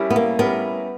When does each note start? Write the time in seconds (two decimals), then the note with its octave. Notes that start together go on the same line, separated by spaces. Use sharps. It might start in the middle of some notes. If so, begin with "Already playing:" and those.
Already playing: G3 C#4 E4 A#4
0.10 B3
0.16 A#3
0.39 G3 B3 C#4 E4 A#4